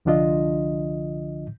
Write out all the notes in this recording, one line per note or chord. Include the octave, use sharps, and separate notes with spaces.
C2 D3 F3 D4 F4 D#5